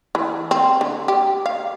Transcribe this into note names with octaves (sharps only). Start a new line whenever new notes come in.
E3
C4
D3
G4
F5